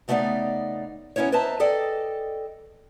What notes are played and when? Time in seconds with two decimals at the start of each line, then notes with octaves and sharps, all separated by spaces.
0.08 C#3 A3 B3 D#4 D5 F5
1.16 B3 C#4 E4 A#4 C#5
1.32 B4 C5 D#5 E5 A5 A#5
1.60 G#4 A4 D5 D#5 G5